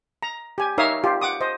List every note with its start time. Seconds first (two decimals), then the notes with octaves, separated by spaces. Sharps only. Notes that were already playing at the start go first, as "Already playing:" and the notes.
0.23 A#5
0.58 G4 G#5
0.78 D#4 A#4 C#5 E5 F5 D#6
1.04 F4 G4
1.21 F#5 D6 D#6
1.41 C5 D#5